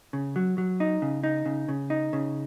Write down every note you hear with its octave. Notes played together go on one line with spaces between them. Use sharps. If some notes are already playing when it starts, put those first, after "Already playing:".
C#3
F#3
F#3
D#4
C#3
D#4
C#3
C#3
D#4
C#3